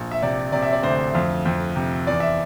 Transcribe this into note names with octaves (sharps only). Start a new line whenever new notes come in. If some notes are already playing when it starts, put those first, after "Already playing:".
Already playing: A#1
E5
C3 D5
C3 D5
E5
D5
D2 C5
F2
F2
C3
E2 D5
E5